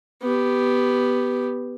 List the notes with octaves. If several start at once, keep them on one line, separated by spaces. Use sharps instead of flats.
B3 G4